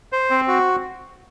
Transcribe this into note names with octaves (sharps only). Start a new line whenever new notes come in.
C5
C4
F#4